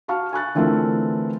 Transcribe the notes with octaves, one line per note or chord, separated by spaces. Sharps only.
F#4 F5 A5 C#6 F6
G#5 C#6 F#6 A6
D3 E3 A3 C4 F4 A#4